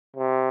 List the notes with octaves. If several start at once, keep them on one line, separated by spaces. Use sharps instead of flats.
C3